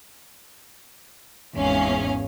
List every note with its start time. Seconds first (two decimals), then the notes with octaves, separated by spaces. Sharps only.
1.56 G#1 E2 G#2 C#4 F5